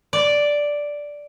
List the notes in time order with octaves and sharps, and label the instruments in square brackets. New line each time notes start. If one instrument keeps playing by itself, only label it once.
[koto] D5